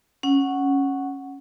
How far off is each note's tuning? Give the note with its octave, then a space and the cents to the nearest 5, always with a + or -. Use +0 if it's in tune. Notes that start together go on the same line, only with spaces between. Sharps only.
C#4 -5 F#5 +0